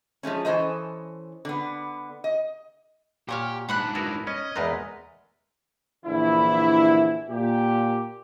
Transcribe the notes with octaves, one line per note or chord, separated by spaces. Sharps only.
F3 G#3 A3 C#4
E3 C#4 A4 C5 D#5
D3 B3
D#5
A#2 G4 C#5 F#5 C#6 F6
G#2 D4 F#5 B5 F#6
B3 E4 F#4 A#4
C#4 D#5
E2 G#3 A3 A#4 B4
A#1 D3 E3 E4
A#2 G4